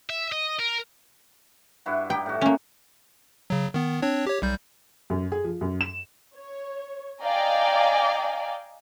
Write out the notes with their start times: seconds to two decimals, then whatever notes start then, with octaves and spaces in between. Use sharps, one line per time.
0.10 E5
0.32 D#5
0.59 A#4
1.86 G2 E4 F#4
2.10 D#4 G4 G5
2.26 A2 F#4
2.41 A#3 C#4
3.50 C#3 F#3
3.74 D#3 B3
4.02 C4 D4 C#5
4.27 G4 C#5
4.42 B1 G3 G6
5.10 F#2
5.32 G#4
5.45 F3
5.61 F#2
5.81 E7
6.36 C#5
7.23 D5 D#5 F5 G5 G#5 A#5